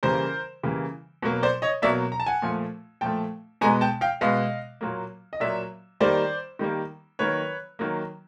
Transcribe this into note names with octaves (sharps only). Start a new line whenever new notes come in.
C#3 E3 G3 A#3 A#4 C5
C#3 E3 G3 A#3
B2 F#3 A#3
C5 D5
C#5 D#5
B2 F#3 A#3 D5 E5
A#5
A5
F#5 G#5
A#2 F3 A3
A#2 F3 A3 G5 A5
B2 G#3 B3 G#5 A#5
G5 A5
F5 G5
B2 G#3 B3 D#5 F5
A#2 F#3 A#3
D#5
A#2 F#3 A#3 D5 E5
D#3 G3 A#3 C5 D5
D#3 G3 A#3
D#3 F#3 A#3 B4 C#5
D#3 F#3 A#3